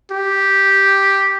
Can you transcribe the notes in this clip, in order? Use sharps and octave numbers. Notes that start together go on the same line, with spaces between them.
G4